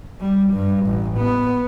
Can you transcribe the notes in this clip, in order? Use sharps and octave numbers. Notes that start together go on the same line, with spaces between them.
G3
G2
A1
B3